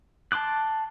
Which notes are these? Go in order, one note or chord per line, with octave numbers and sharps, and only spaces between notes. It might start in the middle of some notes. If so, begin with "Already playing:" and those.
A5 C6 D6 F#6